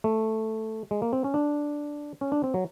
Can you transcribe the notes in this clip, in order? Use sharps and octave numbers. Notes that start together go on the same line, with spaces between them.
A3
G#3
A#3
C4
C#4
D4
C#4
D4
C4
F#3